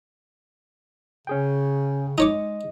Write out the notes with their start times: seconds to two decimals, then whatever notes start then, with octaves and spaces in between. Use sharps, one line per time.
1.27 C#3 C#4 G#4 G5
2.18 G#3 D#4 C#5 D#5 D6